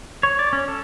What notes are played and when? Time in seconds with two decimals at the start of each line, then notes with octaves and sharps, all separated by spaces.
0.23 C#5
0.39 D5
0.53 C#4
0.68 A4